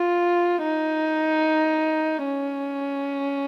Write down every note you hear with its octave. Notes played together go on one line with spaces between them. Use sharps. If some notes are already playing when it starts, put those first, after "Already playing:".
Already playing: F4
D#4
C#4